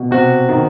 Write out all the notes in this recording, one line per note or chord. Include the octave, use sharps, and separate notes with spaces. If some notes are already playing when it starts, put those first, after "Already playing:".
Already playing: B2
C3 F#4
D#3